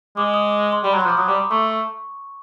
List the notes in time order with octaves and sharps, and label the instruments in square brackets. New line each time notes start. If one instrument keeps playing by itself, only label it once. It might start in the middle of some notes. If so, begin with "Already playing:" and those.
[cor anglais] G#3 [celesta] D6
[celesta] D#6
D6
C6
[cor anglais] G3 [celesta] B5
[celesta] A#5
[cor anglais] F#3
[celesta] C6
[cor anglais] F3 [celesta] D6
[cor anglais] F#3 [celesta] D#6
[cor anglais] G3 [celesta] D6
[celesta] D6
[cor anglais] A3 [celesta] C#6